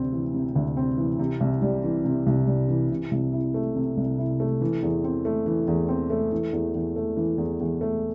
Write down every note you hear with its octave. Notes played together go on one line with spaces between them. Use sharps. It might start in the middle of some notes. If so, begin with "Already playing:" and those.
Already playing: D2 C3 C4
E3
C3
D2
C4
E3
C3
C2
G3
E3
C3
C2
G3
E3
C3
C2
E4
A3
C3
C2
E4
A3
E3
E2
C4
A3
E3
E2
C4
A3
E3
E2
E2
A3
E3
E2
E2
A3